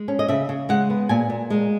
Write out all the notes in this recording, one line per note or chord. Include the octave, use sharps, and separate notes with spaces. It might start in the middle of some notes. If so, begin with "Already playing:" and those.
Already playing: G#3
C#4
D#5
C#3 E5
C#3
G#3 F#5
B3
A#2 G#5
A#2
G#3